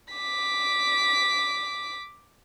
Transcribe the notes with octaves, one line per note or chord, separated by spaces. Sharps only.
D6 B6